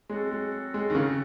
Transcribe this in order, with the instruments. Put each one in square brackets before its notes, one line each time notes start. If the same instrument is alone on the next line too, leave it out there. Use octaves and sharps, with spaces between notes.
[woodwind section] F#3 C4 F#4 A4 [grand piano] G#3
[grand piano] G#3
G#3
D#3
C#3